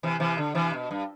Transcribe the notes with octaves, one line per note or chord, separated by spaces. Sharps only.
C3 E3
C3 E3
D3
C3 E3
B2
G2